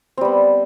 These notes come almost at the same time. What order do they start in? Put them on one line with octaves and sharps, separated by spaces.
C4 G3 B3